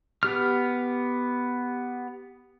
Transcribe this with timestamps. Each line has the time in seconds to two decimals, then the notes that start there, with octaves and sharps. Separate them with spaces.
0.23 B3 G4 F6